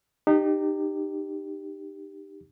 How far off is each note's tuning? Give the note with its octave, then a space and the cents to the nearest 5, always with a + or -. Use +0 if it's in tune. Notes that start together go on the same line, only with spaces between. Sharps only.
D#4 -30 G4 +0